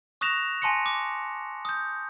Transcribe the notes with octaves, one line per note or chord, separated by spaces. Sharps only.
C#6 D#6 F#6 A#6 E7 F7
G#5 A5 C6 A#6 C#7
D6
D#6 G6